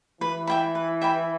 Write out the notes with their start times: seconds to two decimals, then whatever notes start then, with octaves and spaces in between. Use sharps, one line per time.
0.21 E3 B4
0.47 E5 G5 B5
0.75 B4
1.02 E5 G5 B5